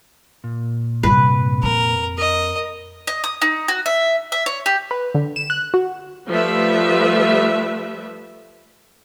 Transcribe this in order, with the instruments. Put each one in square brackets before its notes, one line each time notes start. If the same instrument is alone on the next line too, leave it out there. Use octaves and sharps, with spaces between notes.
[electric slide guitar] A#2
[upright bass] G2 C3 [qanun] B4
[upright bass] F2 [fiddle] A#4
[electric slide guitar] A#4 [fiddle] D#5
[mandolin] D#5
D#6
D#4
F#4
E5
E5
C#5
G4
[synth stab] B4
D3
E7
F#6
F#4
[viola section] F3 G3 A3 B4 E5